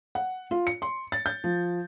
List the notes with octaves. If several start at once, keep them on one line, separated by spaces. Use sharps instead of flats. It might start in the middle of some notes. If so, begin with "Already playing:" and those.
F#5
F4
C#7
C6
A6
G6
F3